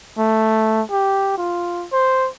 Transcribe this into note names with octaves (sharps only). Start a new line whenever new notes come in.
A3
G4
F4
C5